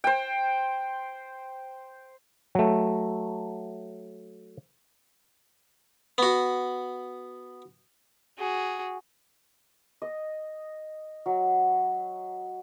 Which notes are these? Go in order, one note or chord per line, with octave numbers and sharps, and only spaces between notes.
C5 G5
F#3 A3
B3 F#4
F#4 G#4
D#5
F#3